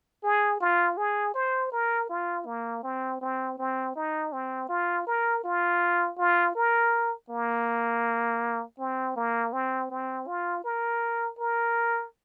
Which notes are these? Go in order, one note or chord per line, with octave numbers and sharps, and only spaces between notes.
G#4
F4
G#4
C5
A#4
F4
A#3
C4
C4
C4
D#4
C4
F4
A#4
F4
F4
A#4
A#3
C4
A#3
C4
C4
F4
A#4
A#4